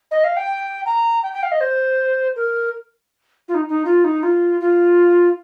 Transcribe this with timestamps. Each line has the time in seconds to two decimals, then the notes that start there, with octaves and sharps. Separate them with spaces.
0.11 D#5
0.24 F5
0.37 G5
0.86 A#5
1.23 G5
1.33 G5
1.43 F5
1.52 D#5
1.61 C5
2.36 A#4
3.48 F4
3.54 D#4
3.69 D#4
3.85 F4
4.04 D#4
4.23 F4
4.61 F4